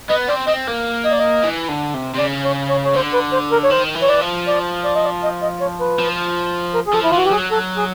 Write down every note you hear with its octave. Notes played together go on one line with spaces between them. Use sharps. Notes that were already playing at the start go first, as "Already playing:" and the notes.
B3 D#5
C4 D5
C4 D#5
A#3
D#5
D5
D#5
E3
D3
C3
C3
C#3 D5
C#5
C#5
C#5
D3 C5
B4
C5
A#4
C#5
D#3 C5
E3
C#5
D5
F3
D5
D5
D#5
D5
D#5
D#5
C#5
B4
F3
A#4
G#4
F3 A4
E4
F4
E3 F#4
G4
F#3 G#4
A4
G#4